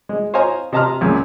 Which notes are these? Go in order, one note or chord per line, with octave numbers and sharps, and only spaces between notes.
G#3
C5 C#5 D#5 F5 G#5 A#5
C3 D#5 A5 A#5 C6 F6
C#2 F#2 A#2